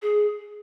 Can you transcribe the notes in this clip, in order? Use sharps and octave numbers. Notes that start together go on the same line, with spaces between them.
G#4